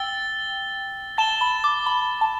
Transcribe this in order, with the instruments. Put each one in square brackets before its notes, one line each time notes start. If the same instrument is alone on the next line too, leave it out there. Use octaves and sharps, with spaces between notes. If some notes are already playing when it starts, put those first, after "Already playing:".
Already playing: [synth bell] G5 [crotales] E6 A6 G7
[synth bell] A5 [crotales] A6 E7 G7
[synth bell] B5
D6
B5
A5